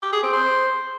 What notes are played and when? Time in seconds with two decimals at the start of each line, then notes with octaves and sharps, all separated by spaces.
0.03 G4
0.13 G#4
0.23 C4
0.33 C5